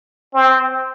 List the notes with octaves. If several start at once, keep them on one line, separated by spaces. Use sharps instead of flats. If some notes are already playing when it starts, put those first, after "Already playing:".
C4